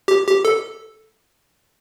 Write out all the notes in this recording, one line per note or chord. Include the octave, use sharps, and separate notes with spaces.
G4
G4
A4